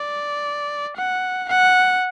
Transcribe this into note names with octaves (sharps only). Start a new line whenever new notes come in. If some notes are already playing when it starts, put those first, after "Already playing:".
Already playing: D5
F#5
F#5